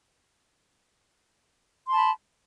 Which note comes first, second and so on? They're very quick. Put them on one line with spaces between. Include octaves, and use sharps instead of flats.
C6 A5 B5